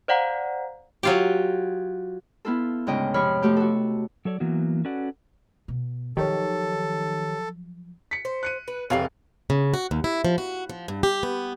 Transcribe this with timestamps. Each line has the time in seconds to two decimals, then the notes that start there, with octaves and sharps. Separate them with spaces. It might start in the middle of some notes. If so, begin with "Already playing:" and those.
0.08 C5 D5 F5 F#5 A#5
1.03 F#3 F4 G4
2.45 B3 E4 F4 A4
2.87 D2 G#2 C#3 C#4 D#5 G5
3.14 F2 C3 F3 C#5 B5 F6
3.42 F3 A3 F#4 G4 G6
3.57 F#4 A4
4.25 F#3 A4 C#5 D5
4.40 E3 F#3 A#3 B3 F#4
4.85 C#4 F#4 A4 B4 D5 F#5
5.68 B2
6.17 D#3 F3 F#3 G4 A4 C#5
8.11 B6 C#7
8.25 C5
8.43 F#6 C#7 D#7
8.68 B4
8.90 F1 C#3 E3 G4 F5 C7
9.50 C#3
9.74 F#4
9.91 D#2
10.04 E4
10.25 F3
10.38 F#4
10.69 F3
10.88 G2
11.03 G4
11.23 B3